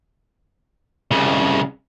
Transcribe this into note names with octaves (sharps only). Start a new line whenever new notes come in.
C2 C#3